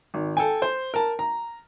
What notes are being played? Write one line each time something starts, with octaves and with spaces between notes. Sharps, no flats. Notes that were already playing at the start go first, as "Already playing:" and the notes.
G#1
A4 G5 G#5
C5
A#4 A5
A#5